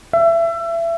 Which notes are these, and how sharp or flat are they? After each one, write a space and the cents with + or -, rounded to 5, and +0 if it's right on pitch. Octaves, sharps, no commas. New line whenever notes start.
E5 +25